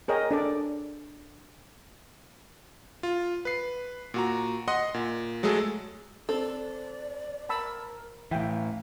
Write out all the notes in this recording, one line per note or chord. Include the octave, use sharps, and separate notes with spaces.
G#4 A#4 C#5 D#5 G5
D4 A4 D5
F4
B4 C7
A#2 F#4 A#5
D#5 F#5 C6 D#6
A#2
F#3 G#3 A3 G#4 A4
C4 A4 D5
A#4 A5 B5 E6
A2 E3 E5 F5 G5